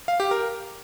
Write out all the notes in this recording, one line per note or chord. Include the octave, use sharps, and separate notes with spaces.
F5
G4
A#4